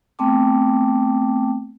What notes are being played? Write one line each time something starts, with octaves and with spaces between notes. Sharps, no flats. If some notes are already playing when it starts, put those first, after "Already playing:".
A3 B3 C4 G5 A5 D6